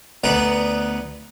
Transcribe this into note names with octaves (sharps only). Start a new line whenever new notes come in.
D2 B3 D#4 D5 F#5